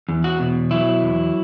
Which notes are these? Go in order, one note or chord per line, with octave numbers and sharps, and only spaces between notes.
E2
F#4
B2
F#3 E4
E2